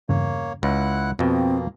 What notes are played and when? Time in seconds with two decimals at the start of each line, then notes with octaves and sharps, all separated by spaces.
0.09 E2 G2 C#3 A#3 C#5
0.63 C#2 E4 F#5 F#6
1.19 F2 B2 A#3 C4